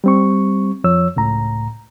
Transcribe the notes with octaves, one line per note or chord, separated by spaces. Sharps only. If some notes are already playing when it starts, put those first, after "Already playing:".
G3 C4 C#6
F2 F3 C#5 E6
C#2 A2 A#5